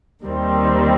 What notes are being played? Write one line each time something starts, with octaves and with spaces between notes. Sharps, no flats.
D#2 D#3 G3 C4